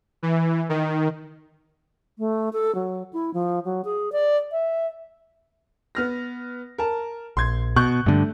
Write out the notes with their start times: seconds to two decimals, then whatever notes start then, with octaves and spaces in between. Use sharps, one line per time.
0.23 E3
0.69 D#3
2.19 A3
2.53 A4
2.75 F#3
3.13 E4
3.34 F3
3.65 F#3
3.85 G#4
4.12 D5
4.52 E5
5.95 B3 F6 A#6
6.78 A#4 A5
7.37 A#1 C6 G#6
7.76 B2 C#6 F#6 G6
8.06 G2 D3 A3